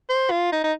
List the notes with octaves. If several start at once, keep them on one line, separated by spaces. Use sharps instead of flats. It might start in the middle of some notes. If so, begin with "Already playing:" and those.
C5
F4
D#4
D#4